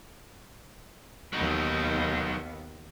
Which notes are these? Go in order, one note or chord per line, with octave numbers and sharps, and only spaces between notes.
D#2 F#3 B3 D#4